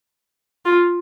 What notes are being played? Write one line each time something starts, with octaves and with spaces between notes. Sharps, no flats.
F4